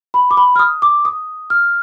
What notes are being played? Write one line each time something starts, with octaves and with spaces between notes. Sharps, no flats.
B5
D6
B5
F6
D#6
D6
D#6
F6